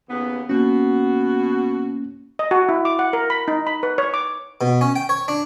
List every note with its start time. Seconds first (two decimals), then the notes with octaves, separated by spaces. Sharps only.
0.09 D#2 C#3 B3
0.49 B2 A#3 C#4 F#4
2.39 D#5
2.51 F#4
2.69 E4
2.85 D6
2.99 F#5
3.13 A#4
3.30 B5
3.48 D#4
3.67 B5
3.83 B4
3.98 C#5
4.14 D6
4.61 B2
4.81 C#4
4.96 G5
5.09 C#5
5.28 D4